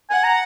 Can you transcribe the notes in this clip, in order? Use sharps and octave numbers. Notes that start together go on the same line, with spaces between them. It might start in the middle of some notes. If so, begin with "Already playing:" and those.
F#5 G#5
A#5